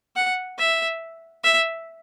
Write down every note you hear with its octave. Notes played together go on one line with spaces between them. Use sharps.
F#5
E5
E5